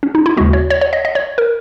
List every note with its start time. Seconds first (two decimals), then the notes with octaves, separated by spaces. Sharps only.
0.03 C#4
0.15 D#4
0.26 E4
0.37 D#2 C#3 G#3 B3 F#4
0.53 C#5
0.70 C#5
0.81 C#5
0.93 D#5
1.05 D#5
1.15 C#5
1.38 A#4